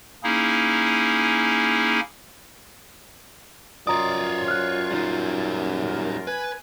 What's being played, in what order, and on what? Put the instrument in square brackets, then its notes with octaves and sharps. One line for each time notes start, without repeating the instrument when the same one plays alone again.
[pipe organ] A#3 C#4 D#4 E4 G#4
[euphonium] F#2 [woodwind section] F4 [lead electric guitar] C#5 D5 [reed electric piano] A#5 D#6
[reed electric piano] F6 F#6
[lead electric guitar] G3 D#4
[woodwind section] F4 A#4
[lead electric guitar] B4 [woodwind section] G#5